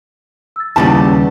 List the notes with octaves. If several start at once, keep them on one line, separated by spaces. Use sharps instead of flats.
E6 A6
D#2 C#3 G3 B3 E4 G4 A5 D6